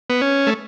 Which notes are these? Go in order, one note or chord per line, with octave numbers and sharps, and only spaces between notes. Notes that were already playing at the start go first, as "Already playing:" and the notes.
B3
C#4
A3